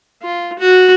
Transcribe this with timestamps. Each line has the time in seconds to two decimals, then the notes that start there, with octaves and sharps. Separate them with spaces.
0.23 F4
0.59 F#4